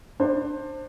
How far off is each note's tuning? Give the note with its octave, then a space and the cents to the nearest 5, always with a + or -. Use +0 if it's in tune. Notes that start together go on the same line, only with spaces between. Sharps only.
D4 +25 C5 +20